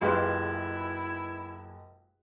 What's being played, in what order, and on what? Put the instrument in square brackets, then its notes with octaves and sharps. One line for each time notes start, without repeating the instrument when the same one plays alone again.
[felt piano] F#1 B1 B4 [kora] G#3 F4 G4 [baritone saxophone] E4